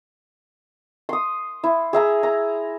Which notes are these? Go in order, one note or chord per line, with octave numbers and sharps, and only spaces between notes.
C6 D#6
E4
G#4 E5 A#5
A#5